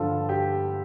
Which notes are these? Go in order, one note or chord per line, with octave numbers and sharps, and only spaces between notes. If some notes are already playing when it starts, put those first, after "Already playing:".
Already playing: G2 D3 F3 F4 A4
G4